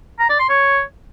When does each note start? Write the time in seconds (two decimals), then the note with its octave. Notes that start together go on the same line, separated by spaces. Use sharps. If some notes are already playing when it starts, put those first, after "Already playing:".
0.19 A#5
0.29 D5
0.39 C6
0.49 C#5